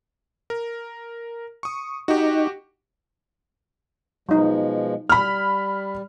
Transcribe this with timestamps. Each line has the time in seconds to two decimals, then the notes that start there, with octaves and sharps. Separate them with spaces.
0.50 A#4
1.63 C#6 D#6
2.08 D#4 F#4 G4
4.29 B2 F3 F#3 G#3 D#4
5.09 G3 B5 F6